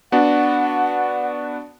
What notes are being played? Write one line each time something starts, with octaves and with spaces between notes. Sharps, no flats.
B3 D4 F#4 F#5